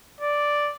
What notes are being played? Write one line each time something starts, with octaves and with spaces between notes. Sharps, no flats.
D5